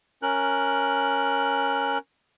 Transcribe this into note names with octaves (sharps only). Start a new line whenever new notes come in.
C#4 A#4 F#6